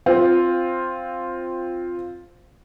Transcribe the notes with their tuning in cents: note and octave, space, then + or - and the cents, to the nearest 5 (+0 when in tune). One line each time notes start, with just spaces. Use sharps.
C4 +0 F4 +5